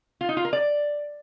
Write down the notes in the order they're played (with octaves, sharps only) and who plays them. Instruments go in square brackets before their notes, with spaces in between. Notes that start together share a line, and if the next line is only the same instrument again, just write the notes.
[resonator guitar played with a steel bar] F4
D#4
F4
A#4
D5